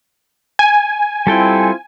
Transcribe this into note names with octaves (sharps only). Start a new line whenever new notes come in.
G#5
G3 C4 E4 F4 A4 G5